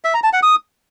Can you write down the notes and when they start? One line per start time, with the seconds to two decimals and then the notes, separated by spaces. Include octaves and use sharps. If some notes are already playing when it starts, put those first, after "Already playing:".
0.04 E5
0.14 A#5
0.24 A5
0.33 F#5
0.43 D#6